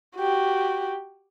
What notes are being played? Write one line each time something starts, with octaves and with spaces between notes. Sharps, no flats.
F#4 G4